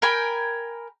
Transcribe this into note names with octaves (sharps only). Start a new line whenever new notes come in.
A#4 G5 G#5 B5